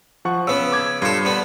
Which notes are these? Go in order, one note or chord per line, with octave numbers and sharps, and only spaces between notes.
F3 F#5 C#6
C#3 B3 C#4 E6
D6 G#6
G2 F4 A4
D3 B3